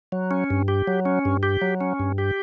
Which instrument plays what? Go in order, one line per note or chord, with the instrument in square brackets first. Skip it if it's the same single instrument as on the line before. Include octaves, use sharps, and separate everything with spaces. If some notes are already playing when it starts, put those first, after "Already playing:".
[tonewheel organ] F#3
C#4
G2
G4
F#3
C#4
G2
G4
F#3
C#4
G2
G4